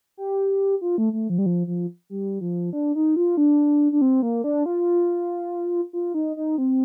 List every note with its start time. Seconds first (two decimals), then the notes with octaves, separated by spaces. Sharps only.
0.17 G4
0.81 F4
0.98 A3
1.13 A3
1.30 F3
1.38 G3
1.46 F3
1.67 F3
2.10 G3
2.41 F3
2.73 D4
2.95 D#4
3.16 F4
3.37 D4
3.92 D4
4.01 C4
4.22 A#3
4.44 D4
4.66 F4
5.93 F4
6.14 D#4
6.37 D#4
6.58 C4